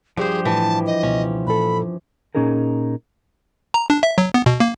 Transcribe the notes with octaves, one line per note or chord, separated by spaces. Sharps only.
G2 F3 G4 G#4 C5
A2 E3 A5
D#5
C#2 B2 C#4
A#2 A4 B5
A#2 G3 C#4 D#4 G#4 A#4
A#5
D4
E5
F#3
B3
B2
A#3